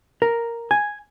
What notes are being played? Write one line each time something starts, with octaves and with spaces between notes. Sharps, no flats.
A#4
G#5